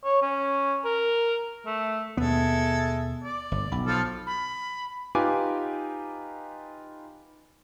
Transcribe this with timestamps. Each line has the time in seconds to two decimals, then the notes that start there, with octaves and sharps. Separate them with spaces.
0.04 C#5
0.22 C#4
0.85 A#4
1.66 A3
2.17 D#2 B2 G#3 B3 A4 E5
3.24 D5
3.52 G1
3.72 B1 B5
3.86 F3 A4 F6
4.26 B5
5.15 D#4 F4 G4 B4 G#5 D6